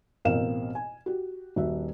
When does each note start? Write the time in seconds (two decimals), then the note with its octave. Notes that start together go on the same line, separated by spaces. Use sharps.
0.25 A1 B2 C4 A#4 F5 E7
0.75 G#5
1.06 F#4 G4
1.56 D#1 F#4 E5